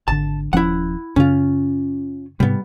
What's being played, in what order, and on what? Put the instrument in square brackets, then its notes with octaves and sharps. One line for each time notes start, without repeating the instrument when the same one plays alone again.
[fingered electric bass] G#1 D3 [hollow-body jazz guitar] A5
[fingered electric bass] D#1 F3 C#4 [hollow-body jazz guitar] E4 F#5
[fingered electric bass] F#2 C#3 [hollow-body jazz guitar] C#4 F4
[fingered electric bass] G#2 C3 [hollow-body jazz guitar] G3 B3